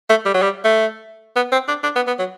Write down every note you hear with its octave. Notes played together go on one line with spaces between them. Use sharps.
A3
G3
F#3
G3
A3
B3
C4
D4
D4
B3
B3
F#3